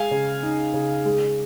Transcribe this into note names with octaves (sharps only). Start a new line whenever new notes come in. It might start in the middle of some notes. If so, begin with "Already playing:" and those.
Already playing: G#3 F5 G#5
C#3
D#4
C#3
G#3